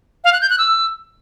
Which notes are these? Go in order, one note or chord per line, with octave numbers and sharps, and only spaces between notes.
F5
F#6
G6
F#6
E6